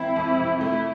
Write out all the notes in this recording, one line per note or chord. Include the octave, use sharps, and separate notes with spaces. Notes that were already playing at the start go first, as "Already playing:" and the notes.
Already playing: F3 C4 E4
F2
C3
A3 E4